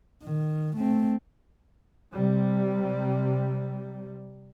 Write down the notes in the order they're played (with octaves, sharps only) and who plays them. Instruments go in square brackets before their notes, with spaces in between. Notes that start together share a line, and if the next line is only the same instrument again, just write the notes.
[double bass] D#3
A3 C4
[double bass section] C3 G3